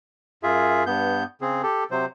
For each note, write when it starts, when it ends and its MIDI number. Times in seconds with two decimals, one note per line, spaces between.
0.43 0.84 42
0.43 0.84 65
0.43 0.84 68
0.43 0.84 76
0.87 1.24 43
0.87 1.24 59
0.87 1.24 91
1.41 1.62 49
1.41 1.62 60
1.41 1.62 68
1.63 1.84 67
1.63 1.84 69
1.91 2.05 48
1.91 2.05 54
1.91 2.05 72